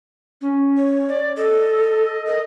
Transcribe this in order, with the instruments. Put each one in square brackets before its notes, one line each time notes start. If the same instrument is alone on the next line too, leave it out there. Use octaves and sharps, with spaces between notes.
[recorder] C#4
[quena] C#5
[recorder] D5
[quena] A4 [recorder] D#5
[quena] A#4 [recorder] D#5